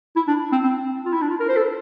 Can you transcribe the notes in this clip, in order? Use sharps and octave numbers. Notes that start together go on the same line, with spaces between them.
E4
D4
C4
C4
F4
E4
D4
F4
A#4
C5
A4